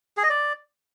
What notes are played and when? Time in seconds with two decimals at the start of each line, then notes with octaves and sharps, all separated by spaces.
0.17 G#4
0.23 D#5
0.30 D5